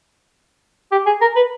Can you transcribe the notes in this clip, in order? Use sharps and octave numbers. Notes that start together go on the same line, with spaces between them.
G4
G#4
A#4
B4